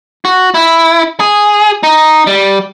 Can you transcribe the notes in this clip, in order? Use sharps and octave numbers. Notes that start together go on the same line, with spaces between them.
F#4
E4
G#4
D#4
G3